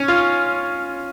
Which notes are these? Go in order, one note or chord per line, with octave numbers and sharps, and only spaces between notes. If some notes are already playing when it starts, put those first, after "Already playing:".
Already playing: C#4
F4